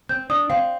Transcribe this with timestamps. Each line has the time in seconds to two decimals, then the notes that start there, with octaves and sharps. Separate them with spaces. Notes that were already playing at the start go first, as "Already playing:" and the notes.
0.09 C4 G6
0.30 D4 D#6
0.50 C4 F5